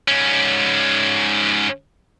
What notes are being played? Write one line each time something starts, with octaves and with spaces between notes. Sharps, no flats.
G#2 C#4